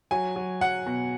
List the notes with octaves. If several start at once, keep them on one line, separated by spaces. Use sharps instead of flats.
F#3 G#5
F#3
F#3 F#5
B2